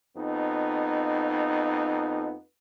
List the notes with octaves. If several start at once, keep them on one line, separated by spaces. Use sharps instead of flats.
F2 B3 D#4